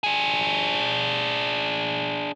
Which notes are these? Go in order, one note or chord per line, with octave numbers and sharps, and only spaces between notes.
D4 G#4